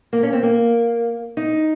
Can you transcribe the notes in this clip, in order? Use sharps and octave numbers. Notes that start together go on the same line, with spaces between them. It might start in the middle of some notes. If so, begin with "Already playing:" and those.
A#3
C#4
C4
A#3
D#4